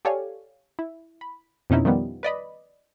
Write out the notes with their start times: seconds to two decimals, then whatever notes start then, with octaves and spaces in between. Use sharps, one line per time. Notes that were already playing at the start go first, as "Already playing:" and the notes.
0.05 G4 A4 C#5 D5 F5 G#5
0.79 E4
1.21 B5
1.70 F2 B2 C#4 D#4 E4
1.85 D#3 F3 G3 B3
2.23 B4 D5 D#5 B5